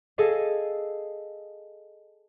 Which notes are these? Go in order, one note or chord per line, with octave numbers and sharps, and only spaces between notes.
G#4 A4 D#5 F5